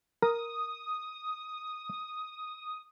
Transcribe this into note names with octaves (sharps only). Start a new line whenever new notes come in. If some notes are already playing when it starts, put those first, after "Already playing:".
A#4 D#6